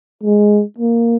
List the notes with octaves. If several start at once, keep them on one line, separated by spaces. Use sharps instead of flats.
G#3
A#3